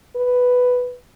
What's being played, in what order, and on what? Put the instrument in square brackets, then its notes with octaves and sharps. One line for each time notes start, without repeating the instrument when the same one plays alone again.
[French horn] B4